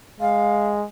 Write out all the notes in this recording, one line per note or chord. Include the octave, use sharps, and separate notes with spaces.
G#3 F5